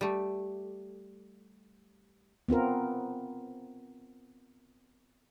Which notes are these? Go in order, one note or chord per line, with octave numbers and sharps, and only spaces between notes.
G3 A3
B3 C4 F4 A#4